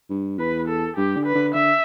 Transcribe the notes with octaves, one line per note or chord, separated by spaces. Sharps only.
G2
E2 B4
A4
G2 G4
D3
B4
D3
D3 E5